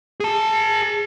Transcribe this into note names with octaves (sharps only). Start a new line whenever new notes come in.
G#4 A5